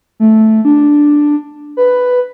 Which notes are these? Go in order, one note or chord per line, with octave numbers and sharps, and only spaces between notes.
A3
D4
B4